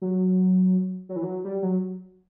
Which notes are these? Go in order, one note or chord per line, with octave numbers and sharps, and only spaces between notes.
F#3
F#3
E3
F#3
G3
F#3